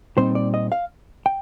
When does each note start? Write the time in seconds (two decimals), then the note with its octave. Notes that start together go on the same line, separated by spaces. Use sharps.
0.17 A#2 G3 C4 D#4 C5
0.35 D5
0.54 D#5
0.72 F5
1.26 G5